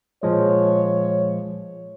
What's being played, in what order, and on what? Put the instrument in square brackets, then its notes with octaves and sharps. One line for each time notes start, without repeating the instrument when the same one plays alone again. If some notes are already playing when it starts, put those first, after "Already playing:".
[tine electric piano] A#2 F3 G#3 [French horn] C#5